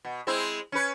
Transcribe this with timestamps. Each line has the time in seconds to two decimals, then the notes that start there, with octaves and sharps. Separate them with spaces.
0.05 B2
0.27 G#3 C4 E4
0.72 C#4 B4